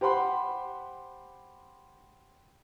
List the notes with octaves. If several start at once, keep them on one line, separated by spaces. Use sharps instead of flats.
G4 C5 F#5 B5 C6